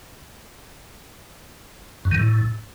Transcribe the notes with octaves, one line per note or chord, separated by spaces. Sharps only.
F#2
D#3
A2